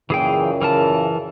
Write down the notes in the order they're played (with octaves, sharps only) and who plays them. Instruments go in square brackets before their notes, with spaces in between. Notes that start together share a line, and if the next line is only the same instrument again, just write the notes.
[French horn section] F#2 A#2 C#3 [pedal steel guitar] E3 G#4 G5
[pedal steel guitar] E3 A#4 A5